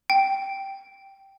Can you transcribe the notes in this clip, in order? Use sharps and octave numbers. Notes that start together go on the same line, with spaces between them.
G5